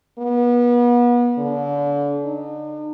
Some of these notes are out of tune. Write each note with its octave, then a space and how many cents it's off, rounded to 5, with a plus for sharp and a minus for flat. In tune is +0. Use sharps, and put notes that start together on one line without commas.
B3 -35
D3 -35
D#4 -45